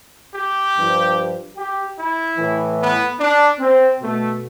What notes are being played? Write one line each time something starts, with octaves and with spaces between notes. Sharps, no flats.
G4
G2 F3
G4
E4
A2 E3
B3
D4
C4
B2 A3